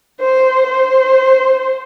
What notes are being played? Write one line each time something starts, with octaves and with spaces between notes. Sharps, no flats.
C5
C5